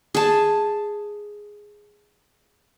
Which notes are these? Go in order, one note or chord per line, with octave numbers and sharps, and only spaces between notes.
G#4 A5